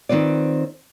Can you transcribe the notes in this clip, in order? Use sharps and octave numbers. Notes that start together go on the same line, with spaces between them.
D#3 C4 F4 B4 D5